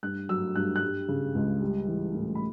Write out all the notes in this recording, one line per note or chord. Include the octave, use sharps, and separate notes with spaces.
G2 F#6
F#3 E6
G2 F#6
F#6
G3
C#3
C#2
G3
E3
A2
B5